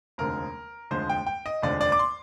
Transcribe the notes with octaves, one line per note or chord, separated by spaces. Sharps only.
F1 D#2 D3 F3 G#3 A#4
F1 D#2 D3 F3 G#3 C5
G5
G5
D#5
F1 D#2 D3 F3 G#3 D5
D5
D6
C6